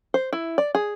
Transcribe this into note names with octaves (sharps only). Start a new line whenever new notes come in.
C5
E4
D5
G#4